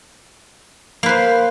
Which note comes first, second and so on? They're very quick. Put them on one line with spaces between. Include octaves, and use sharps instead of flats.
A#3 B4 C5